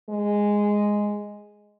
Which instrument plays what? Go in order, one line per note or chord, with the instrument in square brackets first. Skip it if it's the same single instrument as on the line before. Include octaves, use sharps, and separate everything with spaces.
[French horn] G#3